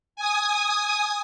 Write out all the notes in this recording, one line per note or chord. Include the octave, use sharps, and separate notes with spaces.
G#5 D#6